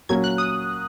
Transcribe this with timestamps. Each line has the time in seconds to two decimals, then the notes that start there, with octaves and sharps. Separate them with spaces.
0.09 A#2 F#3 C#4 F#4 A#4 G#6
0.24 F#6
0.38 D#6